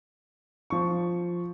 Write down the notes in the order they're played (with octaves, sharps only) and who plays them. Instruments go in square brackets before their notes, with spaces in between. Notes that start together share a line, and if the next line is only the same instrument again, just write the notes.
[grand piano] F3 C#6